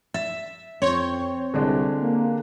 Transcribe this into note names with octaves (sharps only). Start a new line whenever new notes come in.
E5 A6
F2 C4 C#5
C2 D3 G#3 D4
A#3